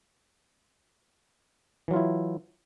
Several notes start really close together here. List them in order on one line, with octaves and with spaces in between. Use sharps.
E3 F#3 F4 E4